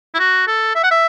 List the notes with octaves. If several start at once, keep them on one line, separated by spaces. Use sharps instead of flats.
E4
F#4
A4
E5
F#5
E5